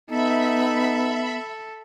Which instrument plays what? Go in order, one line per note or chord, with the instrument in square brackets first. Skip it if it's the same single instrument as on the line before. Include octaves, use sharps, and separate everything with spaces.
[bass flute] B3 [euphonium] D#4 [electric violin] A4 [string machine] E5 B5